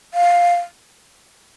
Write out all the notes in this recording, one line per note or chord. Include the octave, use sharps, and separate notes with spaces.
F5